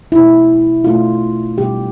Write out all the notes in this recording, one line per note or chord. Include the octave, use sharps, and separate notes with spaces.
B2 A3 D4 E4
B2 A3 D4 F4
B2 G3 D4 G4